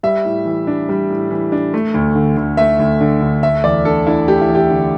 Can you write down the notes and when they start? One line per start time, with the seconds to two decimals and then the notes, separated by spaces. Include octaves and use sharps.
0.03 G3 E5
0.25 A2
0.45 E3
0.67 D4
0.89 G3
1.10 A2
1.31 E3
1.52 D4
1.74 A3
1.94 D2
2.15 D3
2.37 D2
2.57 A3 E5
2.79 D2
3.01 D3
3.21 D2
3.43 A3 E5
3.64 E2 D5
3.85 D3 A4
4.07 D4 E4
4.27 A3 G4
4.41 E4
4.49 E2
4.55 G4
4.70 D3